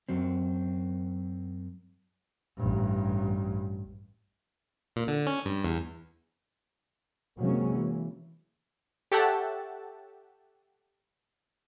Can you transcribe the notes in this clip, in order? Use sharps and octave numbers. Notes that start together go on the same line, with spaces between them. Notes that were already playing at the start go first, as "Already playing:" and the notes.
F#2 F#3 C4
A1 G2
A#2
D3
C#4
G2
E2
C3 D#3 F#3 G#3 A#3 C#4
E3
G4 A4 C#5 E5 F#5 A5